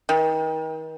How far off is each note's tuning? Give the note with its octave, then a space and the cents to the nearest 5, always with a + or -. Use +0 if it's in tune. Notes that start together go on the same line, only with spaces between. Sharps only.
D#3 +35